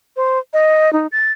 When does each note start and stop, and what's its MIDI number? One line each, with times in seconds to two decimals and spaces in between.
0.16 0.39 72
0.53 0.92 75
0.93 1.07 63
1.12 1.32 93